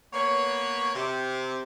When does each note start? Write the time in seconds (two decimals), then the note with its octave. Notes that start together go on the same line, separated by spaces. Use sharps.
0.13 A#3 B3 B4 C#5
0.94 C3